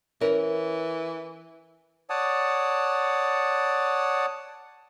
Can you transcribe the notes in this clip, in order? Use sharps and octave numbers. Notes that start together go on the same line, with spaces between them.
E3 C#4 A#4
C#5 D5 F#5 A5 D#6